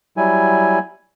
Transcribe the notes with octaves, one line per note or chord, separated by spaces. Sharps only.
F#3 G3 E4 G#5